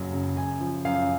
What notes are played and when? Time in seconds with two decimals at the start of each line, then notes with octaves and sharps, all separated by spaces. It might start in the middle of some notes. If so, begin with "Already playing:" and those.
Already playing: F#1 F#2 F#3
0.13 C#3
0.37 F#2 G#5
0.61 F3
0.85 F#2 F5